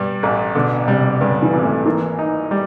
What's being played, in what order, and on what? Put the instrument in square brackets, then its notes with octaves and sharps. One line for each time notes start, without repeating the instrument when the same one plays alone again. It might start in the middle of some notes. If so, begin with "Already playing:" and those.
Already playing: [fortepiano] G2 G3 [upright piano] B2
[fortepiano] A1
[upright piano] B2 [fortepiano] D3
[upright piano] C3 [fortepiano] G3
[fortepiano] G2 [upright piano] C#3
[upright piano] E3
[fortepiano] G#1
[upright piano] A3
[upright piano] E3 [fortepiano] A#3
[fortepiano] D#4
G3